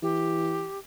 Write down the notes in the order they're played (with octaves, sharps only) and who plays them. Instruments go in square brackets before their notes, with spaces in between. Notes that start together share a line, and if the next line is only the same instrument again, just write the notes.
[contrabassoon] E3 [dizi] G4